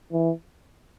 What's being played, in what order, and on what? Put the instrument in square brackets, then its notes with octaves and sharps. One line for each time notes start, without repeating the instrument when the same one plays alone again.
[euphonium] E3